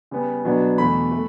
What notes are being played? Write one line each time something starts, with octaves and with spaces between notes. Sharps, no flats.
C#3 G3 B3
B2 F#3 B3 D4
E2 B2 A3 B5
A3